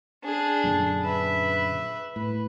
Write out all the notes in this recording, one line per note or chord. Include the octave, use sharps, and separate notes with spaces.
D4 G#4
F#2 A#2 D3
B4 E5
A2 B4